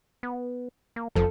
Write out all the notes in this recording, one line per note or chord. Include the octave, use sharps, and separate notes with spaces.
B3
A#3
F1 F2 F3 A4